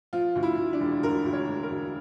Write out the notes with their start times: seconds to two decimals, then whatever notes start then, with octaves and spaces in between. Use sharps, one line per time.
0.13 F3 F4
0.36 D2
0.43 E4
0.58 D2
0.73 D4
0.81 E1
1.03 D2 A#4
1.25 D2
1.33 C#5
1.48 E1
1.63 A#4
1.71 D2